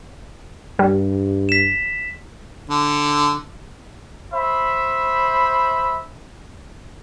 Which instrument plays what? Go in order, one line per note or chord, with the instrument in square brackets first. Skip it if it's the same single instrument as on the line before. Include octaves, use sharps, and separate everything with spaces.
[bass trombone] G2 [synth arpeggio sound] G3
[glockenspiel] B6 E7
[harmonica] D3
[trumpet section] C5 E5 B5